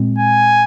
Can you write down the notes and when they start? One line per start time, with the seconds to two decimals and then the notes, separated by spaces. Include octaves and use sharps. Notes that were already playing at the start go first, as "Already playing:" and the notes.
Already playing: A#2 G#3 C4
0.18 G#5